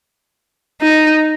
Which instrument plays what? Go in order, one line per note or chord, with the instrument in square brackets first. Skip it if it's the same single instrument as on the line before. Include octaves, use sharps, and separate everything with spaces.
[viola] D#4